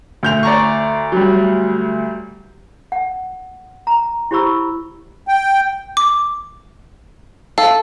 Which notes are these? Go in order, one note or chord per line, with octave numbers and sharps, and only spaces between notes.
D2 G6 F7
D5 A#5 C#6
F#3 G3
F#5
A#5
E4 G4 C5 B5 C#6 E6
G5
D6
A4 F5